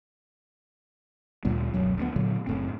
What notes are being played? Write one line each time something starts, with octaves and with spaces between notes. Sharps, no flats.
D2 A#2 G3 B3
D1 B1 F#2 F#3
D2 A3 B3
A#2 D3 F#3 B3
F#1 A2 C4